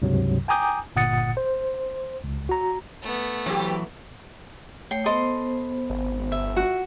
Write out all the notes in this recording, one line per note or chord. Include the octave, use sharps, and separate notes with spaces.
C#2 G2 C3 F#3
G5 G#5 A#5 D6 D#6 G6
G1 A#2 F#5 D#6 A6 C#7
C5
C#2
F#4 A#5
A3 B3
E3 F#3 C4 G4
A3 C#5 G5
B3 A4 C5 D#5 C6
G#1
G1 E5
F#4